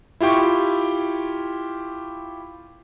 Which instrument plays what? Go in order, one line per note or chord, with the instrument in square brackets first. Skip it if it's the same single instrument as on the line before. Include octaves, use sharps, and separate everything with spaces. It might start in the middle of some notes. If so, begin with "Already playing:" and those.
[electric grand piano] E4 F4 G4 G5 C#6